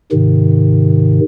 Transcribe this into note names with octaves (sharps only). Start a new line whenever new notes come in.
G#2 C3 D#3